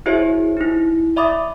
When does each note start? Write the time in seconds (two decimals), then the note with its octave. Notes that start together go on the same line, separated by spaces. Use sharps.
0.06 E4 F#4 G#4 C5 C#5 E5
0.57 D#4 E4
1.16 D5 E5 B5 D6 D#6 A6